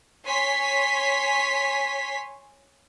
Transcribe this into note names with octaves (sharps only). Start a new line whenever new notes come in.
C#5 G#5 C6 B6